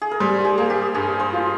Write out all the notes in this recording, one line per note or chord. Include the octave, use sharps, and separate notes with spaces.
G#4
A#4
G3 C5
G4 G#4
A#3
G4
G2 G#4
C5
F4